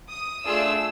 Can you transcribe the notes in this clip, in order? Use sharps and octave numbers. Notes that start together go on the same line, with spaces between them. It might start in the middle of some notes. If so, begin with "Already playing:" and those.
D#6
A3 D4 F4 G#4 E6